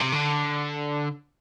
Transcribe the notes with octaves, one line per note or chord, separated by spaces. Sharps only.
C3
D3